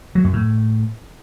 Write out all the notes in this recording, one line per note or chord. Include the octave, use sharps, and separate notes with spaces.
F#3
F#2
A2